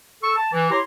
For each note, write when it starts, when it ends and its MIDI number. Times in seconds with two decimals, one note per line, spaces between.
0.23 0.32 69
0.23 0.32 85
0.23 0.32 88
0.36 0.49 81
0.52 0.70 52
0.70 0.79 64
0.70 0.79 67
0.70 0.79 73
0.70 0.79 82
0.70 0.79 84